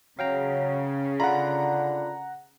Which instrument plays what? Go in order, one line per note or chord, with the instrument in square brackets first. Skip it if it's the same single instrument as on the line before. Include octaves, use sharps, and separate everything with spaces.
[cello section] C#3 [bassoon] F#3 [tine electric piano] F5 G5 A#5
[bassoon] D3 [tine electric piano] F4 B5 [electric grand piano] F#5 A#5